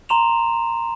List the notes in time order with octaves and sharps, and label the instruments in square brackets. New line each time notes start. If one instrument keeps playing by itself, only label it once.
[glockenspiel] A#5 C6 E7 F7